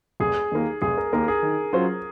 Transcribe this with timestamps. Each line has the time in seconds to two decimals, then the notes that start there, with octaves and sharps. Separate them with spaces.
0.20 F1 G#4
0.52 D#2 D#3 A#3
0.82 F1 G#4
0.98 A#4
1.13 D#2 D#3 A#3 A#4
1.28 G#4
1.42 D#3
1.73 F#3 C#4 F4 C5